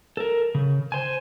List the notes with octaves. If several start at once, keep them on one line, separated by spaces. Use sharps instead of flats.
A4 A#4
C#3
C5 G#5